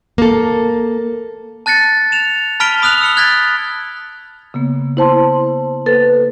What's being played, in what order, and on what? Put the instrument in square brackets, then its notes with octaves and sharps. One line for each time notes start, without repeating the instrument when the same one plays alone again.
[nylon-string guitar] A#3 A4
[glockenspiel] A5 F#6 A6 A#6 C#7
E7 F7
A5 B5 F6 B6 D7 G7
B5 D#6 F6 F#6 F7 F#7
E6 C#7 G7
F#6 G#6 A6 B6
[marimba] C#3 A#3 B3
E4 C5 A5 C6
A#3 A4 B4 A6